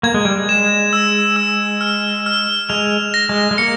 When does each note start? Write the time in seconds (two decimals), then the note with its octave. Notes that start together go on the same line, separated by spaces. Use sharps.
0.03 A#3 G#6
0.14 G#3
0.25 G3
0.36 G#3
0.49 E7
0.93 E6
1.36 E6
1.81 F6
2.26 F6
2.69 G#3 F7
3.14 A#6
3.29 G#3
3.51 G#3
3.58 A#3 C#7